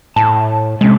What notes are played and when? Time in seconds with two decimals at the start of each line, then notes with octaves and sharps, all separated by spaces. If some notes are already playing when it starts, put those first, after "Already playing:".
0.16 A2 A5
0.81 C3 G#3 A3 C#4